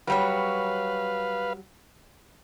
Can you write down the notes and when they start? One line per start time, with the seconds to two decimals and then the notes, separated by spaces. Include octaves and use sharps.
0.07 F#3 G3 B4 C#5 F5